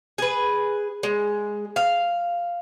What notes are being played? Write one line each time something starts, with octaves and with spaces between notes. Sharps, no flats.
G#4 B4
G#3
F5